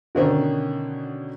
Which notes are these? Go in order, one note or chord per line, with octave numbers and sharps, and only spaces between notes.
B2 D3 D#3 C#4